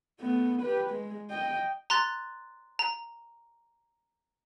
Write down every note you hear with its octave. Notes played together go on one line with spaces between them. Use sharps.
A3 B3
G4 B4
G#3
D#5 G5
A#5 C6 F#6 A6
A#5